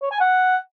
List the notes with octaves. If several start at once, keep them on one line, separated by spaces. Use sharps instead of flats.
C#5
G#5
F#5